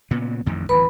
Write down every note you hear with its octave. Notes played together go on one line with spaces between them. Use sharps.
A#2 C#3 B3
A1 F2 D#3
D1 E3 B4 B5